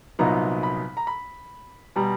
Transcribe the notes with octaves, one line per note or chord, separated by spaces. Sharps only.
C2 A#2 F#3 B3 D#4 A#5
B5
A#5
B5
B2 G3 A#5